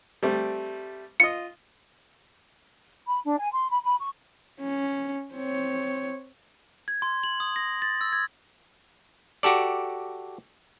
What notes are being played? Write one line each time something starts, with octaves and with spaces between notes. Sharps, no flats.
G3 A3 C4
F4 D#5 C#7
B5
D4
G#5
C6
B5
B5
C#6
C#4
C4 C#5
G#6
C6
F#7
D#6
A#6
A6
E6
G#6
F#4 G4 A4 D5